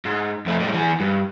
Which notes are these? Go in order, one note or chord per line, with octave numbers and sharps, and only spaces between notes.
G#2
F2 A3
A2 G3
E3 G#4
G2